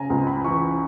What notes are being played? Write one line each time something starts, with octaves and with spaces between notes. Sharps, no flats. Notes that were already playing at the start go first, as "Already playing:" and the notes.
Already playing: C#3 G#5 A#5
C#2
B5
E3 C#6